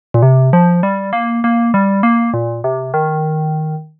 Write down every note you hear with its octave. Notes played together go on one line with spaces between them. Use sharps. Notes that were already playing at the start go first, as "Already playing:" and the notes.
A#2
C3
F3
G3
A#3
A#3
G3
A#3
A#2
C3
D#3